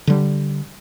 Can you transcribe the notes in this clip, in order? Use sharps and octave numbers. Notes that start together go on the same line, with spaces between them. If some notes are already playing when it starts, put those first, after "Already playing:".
D3 G3